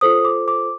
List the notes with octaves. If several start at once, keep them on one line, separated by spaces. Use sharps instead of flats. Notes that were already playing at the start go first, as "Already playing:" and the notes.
F4 A4 C5 D#6
D6
D6